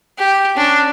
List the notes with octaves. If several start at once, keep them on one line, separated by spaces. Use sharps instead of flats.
G4
C#4 D4